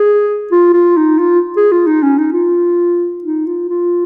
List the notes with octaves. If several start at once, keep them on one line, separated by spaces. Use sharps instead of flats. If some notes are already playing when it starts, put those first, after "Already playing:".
Already playing: G#4
F4
F4
D#4
F4
G#4
F4
D#4
C#4
D#4
F4
D#4
F4
F4